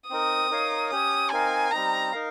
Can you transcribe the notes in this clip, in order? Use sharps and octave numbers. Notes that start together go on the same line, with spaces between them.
C4 D#4 A#4 D#6
D#4 A#4 C#5 F5
C#4 G4 C#5 D#6
C4 D#4 A#4 F5 G#5
G3 C4 D#4 A#5
D#4 A#4 F5